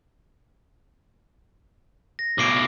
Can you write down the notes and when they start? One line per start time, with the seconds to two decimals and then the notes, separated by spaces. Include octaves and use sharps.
2.19 A#6
2.38 B1 A2 D6 C7 D7